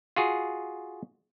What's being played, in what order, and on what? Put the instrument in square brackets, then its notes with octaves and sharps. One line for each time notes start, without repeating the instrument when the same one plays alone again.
[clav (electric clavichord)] F4 F#4 G#4